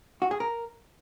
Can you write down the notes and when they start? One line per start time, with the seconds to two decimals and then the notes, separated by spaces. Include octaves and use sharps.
0.22 F#4
0.31 G#4
0.40 A#4